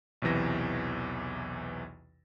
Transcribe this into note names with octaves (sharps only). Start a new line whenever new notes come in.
B1 E2 C3 E3 A#6